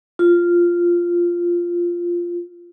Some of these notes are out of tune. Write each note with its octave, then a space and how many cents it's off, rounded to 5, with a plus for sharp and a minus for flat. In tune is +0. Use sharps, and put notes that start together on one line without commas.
F4 -5